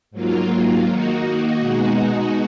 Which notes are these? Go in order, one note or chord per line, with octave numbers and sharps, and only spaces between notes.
G#2 F#3 A#3 F4
D#3 A#3 D#4 F#4
B2 G#3 D#4 F#4